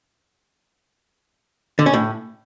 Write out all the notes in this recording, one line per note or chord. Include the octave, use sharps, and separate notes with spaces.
D3
C#4
A2